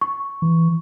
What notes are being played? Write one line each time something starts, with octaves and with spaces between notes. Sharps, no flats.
C#6
E3